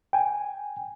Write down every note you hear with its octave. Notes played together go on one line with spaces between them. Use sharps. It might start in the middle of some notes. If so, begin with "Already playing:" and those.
G5 G#5